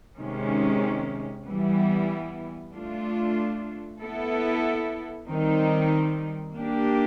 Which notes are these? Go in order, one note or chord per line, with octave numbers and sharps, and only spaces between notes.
C3 D#3 G#3 C#4
E3 G3 B3
A3 D4 F4
B3 E4 A4
D#3 G3 C4 D#4
A#3 D4 G4